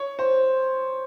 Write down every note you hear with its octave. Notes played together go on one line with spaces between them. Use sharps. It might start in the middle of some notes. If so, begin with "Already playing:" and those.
Already playing: C#5
C5